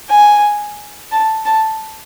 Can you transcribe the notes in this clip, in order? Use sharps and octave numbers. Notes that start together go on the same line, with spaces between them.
G#5
A5
A5